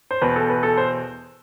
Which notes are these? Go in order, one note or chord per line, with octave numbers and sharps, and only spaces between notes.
C5
E2 B2 B4
A4
B4
A4
C5